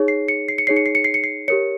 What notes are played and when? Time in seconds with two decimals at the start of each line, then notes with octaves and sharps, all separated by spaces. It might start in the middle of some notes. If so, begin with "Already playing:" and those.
Already playing: D#4 G#4 C#5
0.08 C7
0.28 C#7
0.48 C7
0.58 C#7
0.67 D#4 G#4 C#5 C7
0.76 C#7
0.86 C7
0.95 C#7
1.04 C7
1.14 C#7
1.24 C7
1.48 G4 A#4 C#5 C#7